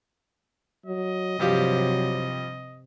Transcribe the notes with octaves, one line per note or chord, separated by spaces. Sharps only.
F#3 D#5
G2 C3 F3 F#3 G4